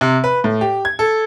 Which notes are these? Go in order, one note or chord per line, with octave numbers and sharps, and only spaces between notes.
C3
B4
A2
G4
G#6
A4